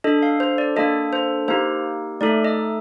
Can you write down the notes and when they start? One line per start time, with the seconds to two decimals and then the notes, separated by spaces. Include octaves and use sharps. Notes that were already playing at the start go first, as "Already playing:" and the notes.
0.04 D4 A4 D#5
0.23 F5
0.40 C5
0.58 D5
0.76 A#3 D4 A4 D#5
1.13 C5
1.48 A#3 D#4 G4 C5
2.21 A3 D#4 A4 D5
2.44 D#5